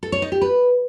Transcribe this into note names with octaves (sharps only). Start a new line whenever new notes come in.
A4
C#5
D#4
G4
B4